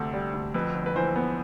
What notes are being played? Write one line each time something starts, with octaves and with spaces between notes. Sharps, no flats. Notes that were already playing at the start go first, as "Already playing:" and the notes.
Already playing: D2 C3 A4
G3
D2
F2 B4
G1
B4
E3 C5
B3